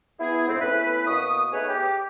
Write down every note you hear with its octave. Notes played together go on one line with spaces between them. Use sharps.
B3 E4 G#4
F2 G#2 C4
A3 B3 C#4 E4 B4
B2 A#3 C#6 D#6
A3 B3 D#4 G#4 B4 C#5
G4